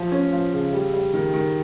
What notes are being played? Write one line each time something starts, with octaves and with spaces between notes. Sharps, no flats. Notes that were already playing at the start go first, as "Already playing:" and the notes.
Already playing: F3
C#4
F3
C#3
G3
G3
D#3
D#3